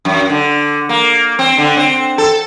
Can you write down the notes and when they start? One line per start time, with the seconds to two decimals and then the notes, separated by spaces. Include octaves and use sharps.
0.05 F#2
0.29 D3
0.89 A#3
1.39 C4
1.58 D3
1.77 C4
2.18 A4